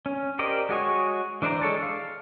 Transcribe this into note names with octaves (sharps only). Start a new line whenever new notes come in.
C#4
G4 A#4 C5 D5 D#5
G#3 F#4 G#4 C#5
E3 D4 C5 D5 A#5
G#3 A4 C#5 A5
F5